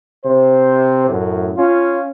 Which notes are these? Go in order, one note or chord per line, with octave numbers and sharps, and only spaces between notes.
C3 C5
F#2 A2
C#4 F4